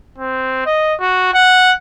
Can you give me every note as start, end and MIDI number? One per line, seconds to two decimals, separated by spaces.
0.18 0.65 60
0.66 0.94 75
1.00 1.32 66
1.34 1.73 78